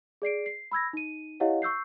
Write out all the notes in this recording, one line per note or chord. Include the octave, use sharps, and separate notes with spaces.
G#4 D5 C7 D7
C7
B5 E6 G#6 A#6
D#4 D#7
E4 G4 C#5 D#5 F5 F#5
C#6 E6 G6 C7